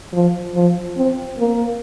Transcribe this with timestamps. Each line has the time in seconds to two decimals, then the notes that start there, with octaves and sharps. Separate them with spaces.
0.13 F3
0.55 F3
0.97 C4
1.39 A#3